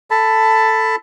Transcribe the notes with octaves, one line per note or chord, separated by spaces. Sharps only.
A4 A5 B5